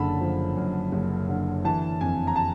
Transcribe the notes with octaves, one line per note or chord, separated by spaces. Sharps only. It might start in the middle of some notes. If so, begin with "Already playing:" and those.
Already playing: F#1 F#2 D3 A5 B5
F3
F#2
F#1
D3
E3 A5
F2 G#5
A#5
A5